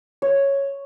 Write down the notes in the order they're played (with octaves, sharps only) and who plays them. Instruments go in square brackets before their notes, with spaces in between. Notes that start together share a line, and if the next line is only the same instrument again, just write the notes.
[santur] C#5